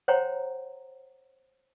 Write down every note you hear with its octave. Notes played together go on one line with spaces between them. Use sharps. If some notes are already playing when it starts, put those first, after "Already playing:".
C5 C#5 F#5 G5 A#5 C6